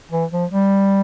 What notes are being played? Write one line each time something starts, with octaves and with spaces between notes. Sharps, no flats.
E3
F3
G3